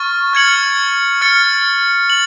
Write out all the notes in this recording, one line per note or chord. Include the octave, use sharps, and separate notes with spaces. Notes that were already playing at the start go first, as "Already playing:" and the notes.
Already playing: C#6 F6 A6
F6 G#6 C#7 F#7
F6 A6 C#7
F#7